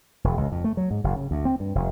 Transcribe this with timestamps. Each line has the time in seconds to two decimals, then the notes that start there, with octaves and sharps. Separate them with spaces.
0.24 E1
0.37 C#2
0.52 F2
0.64 A3
0.77 F#3
0.91 G#2
1.04 F#1
1.15 C#3
1.31 D2
1.45 C4
1.60 G2
1.75 F1